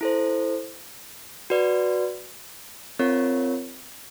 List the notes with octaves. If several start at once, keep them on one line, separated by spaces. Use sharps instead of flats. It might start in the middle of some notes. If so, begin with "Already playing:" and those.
E4 A4 C5
F#4 B4 D5
C4 F4 A#4 C#5